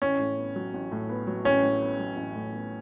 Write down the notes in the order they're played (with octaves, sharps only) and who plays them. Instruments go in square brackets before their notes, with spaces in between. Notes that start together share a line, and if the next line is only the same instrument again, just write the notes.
[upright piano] A1 [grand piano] C#4
[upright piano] A2
B3
F#3
A1
A2
B3
F#3
[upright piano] A1 [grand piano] C#4
[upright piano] A2
B3
F#3
A1
A2
B3